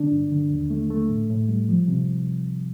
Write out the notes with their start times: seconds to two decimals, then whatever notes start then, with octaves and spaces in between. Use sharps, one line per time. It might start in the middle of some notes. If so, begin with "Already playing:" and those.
Already playing: D3 D4
0.12 G2
0.31 D3
0.50 D#2
0.70 A3
0.91 A3
1.09 A2
1.30 A2
1.49 G3
1.69 F3
1.88 C3